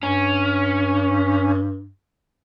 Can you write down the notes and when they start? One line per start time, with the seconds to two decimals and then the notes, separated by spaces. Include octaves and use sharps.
0.03 G2 C#4